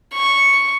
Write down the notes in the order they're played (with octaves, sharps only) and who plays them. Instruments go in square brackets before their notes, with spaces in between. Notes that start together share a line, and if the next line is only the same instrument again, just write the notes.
[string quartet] C#6